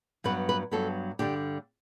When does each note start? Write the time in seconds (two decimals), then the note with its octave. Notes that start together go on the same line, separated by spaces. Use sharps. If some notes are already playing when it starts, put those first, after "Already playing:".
0.24 G2 F#3 B3 B4
0.49 B4
0.72 G2 F#3 B3 A4
1.19 G2 D3 G3 G4